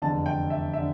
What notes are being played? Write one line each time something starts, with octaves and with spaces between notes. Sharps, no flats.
F1 E2 D3 A5
G5
E5
D3 E5